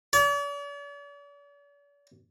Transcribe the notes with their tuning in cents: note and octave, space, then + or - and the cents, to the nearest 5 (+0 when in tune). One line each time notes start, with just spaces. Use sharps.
D5 -45